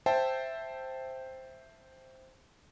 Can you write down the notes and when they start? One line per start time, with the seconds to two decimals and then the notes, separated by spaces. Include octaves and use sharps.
0.06 C5 E5 G5 A5